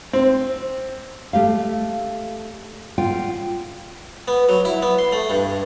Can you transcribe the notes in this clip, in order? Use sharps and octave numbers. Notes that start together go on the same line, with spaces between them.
C4
A3 G4 F5
F4 F#5 G5
B3
F#3
E4
B3
C6
A3
G2